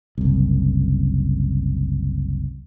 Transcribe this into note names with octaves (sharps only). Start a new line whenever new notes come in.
F#1 C2